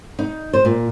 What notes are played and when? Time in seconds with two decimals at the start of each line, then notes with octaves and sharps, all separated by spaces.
0.19 D#4
0.53 C5
0.65 A#2